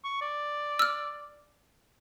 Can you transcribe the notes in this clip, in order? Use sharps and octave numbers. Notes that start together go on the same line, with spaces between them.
C#6
D5
E6 F6